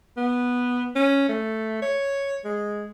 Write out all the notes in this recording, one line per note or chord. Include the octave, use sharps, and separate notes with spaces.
B3
C#4
A3
C#5
G#3